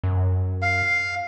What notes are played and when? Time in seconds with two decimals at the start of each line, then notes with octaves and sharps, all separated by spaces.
0.04 F#2
0.62 F5